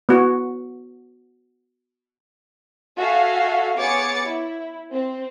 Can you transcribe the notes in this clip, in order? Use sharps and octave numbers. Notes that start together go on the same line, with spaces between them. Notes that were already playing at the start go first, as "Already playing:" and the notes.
B3 F#4
F#4 A4 E5 F5 G#5
B3 G#4 C#5 D6 A6 C#7
E4
C4